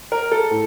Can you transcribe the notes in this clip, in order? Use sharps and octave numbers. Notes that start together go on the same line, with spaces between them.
A#4
A4
A2